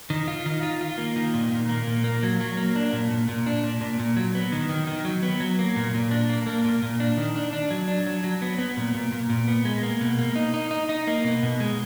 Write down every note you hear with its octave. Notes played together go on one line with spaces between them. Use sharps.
D#3
F4
D#3
F4
F4
A#3
D#3
A#2
A#2
A#3
A#2
A#3
F#3
F#3
A#3
D4
A#2
A#2
A#2
D4
A#2
A#2
A#2
F#3
B3
D#3
D#3
D#3
F#3
B3
F#3
A#3
A#2
A#2
D4
A#3
A#3
A#2
A#2
D4
D#3
D4
D4
F#3
D4
F#3
F#3
B3
B3
A#2
A#2
A#2
A#2
B3
G#3
A#3
B2
A#3
D#4
D#4
D#4
D#4
A#3
B2
B2
G#3